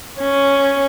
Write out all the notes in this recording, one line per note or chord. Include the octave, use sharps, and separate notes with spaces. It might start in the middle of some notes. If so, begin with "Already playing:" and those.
C#4